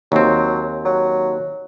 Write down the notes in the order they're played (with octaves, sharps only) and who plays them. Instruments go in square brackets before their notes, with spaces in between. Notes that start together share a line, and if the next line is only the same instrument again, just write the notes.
[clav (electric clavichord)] D#2 C4 [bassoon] F#3
[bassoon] F#3